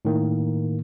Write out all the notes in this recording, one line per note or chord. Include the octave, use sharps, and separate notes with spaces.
A2 D#3 A#3